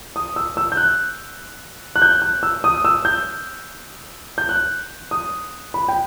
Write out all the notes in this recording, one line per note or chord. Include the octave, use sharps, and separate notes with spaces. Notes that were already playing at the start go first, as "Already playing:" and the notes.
D#6
E6
E6
G6
F#6
F#6
G6
F#6
E6
D#6
E6
G6
G6
F#6
D#6
B5
G5